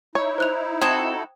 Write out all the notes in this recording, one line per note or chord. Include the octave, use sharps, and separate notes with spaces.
D#4 E4 C#5
C5 F#6 F7
C4 F#4 A4 D#6 G#6